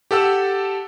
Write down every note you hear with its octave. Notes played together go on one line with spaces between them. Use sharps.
G4 A4 F#5 E6